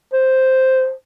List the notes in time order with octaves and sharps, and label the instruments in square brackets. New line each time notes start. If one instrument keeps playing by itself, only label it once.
[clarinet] C5